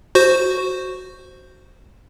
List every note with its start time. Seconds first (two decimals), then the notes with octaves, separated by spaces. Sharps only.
0.15 F#4 C5